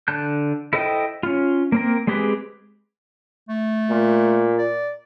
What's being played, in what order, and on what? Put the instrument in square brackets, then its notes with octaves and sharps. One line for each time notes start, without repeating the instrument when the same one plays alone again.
[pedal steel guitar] D3 A5 F#6 G6
E4 A4 C5 D#5 G5
C#4 F4
A#3 C4 A#4
G#3 C4 G4 G#4 B4
[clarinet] A3
[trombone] A#2
[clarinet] D5